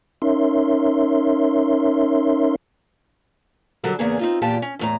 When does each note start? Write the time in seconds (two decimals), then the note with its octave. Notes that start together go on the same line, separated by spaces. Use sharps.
0.22 C#4 D#4 A#4 C#5 E5 C6
3.84 D3 F#3 G3 C4 A4 A#4
3.99 E2 C#3 A#3 B3 D4 G#4
4.19 C4 D#4 F4
4.42 E2 A#2 F4 G4 A5
4.62 C#4
4.79 E2 A2 A#5